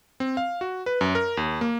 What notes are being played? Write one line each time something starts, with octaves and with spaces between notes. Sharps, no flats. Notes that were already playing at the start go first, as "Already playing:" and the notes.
C4
F5
F#4
B4
F#2
A#4
D#2
A#3